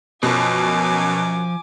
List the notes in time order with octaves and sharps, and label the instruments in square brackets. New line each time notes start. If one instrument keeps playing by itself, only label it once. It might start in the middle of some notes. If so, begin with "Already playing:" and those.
[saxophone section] F#2 [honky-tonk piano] B2 [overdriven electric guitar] F3 [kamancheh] G#5 D6